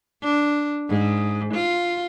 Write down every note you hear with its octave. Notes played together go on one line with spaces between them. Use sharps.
D4
G#2
F4